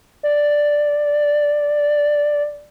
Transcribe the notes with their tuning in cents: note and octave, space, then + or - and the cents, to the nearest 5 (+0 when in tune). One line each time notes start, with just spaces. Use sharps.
D5 +0